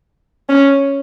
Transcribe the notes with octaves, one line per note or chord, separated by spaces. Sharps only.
C#4